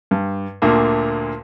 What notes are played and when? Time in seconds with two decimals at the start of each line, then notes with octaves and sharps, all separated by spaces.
0.11 G2
0.62 D2 A#2 D3 A#3